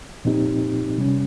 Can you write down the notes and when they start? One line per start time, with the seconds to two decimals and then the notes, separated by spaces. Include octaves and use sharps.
0.25 A#2 F3 C4 D#4 G4
0.98 C3 G3 C#4